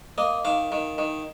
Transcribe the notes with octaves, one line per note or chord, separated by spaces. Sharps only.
A#3 D#5
D#3 F5
D#3
D#3